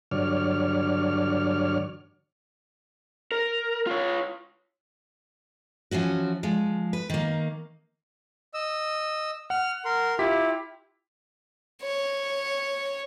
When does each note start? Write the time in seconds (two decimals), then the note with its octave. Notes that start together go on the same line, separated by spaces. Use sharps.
0.11 G2 D3 F#3 C#5 D5 F6
3.32 A#4
3.87 F4 C#5
5.91 E3 F3 C#4 F#4
6.43 F3 G#3
6.93 B4
7.10 D#3 A#3
8.54 D#5 E6
9.50 F#5 F6
9.85 A#4 C6
10.19 E4 F4 G4 B6
11.82 C#5